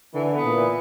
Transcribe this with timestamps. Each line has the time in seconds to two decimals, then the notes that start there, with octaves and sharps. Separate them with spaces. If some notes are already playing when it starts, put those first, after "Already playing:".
0.14 D3 E3
0.35 B3
0.44 A#2
0.54 E3